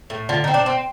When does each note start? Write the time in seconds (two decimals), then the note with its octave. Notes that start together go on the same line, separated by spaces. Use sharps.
0.10 A2
0.29 D3 F4
0.44 C4 D#4
0.54 D4
0.66 C4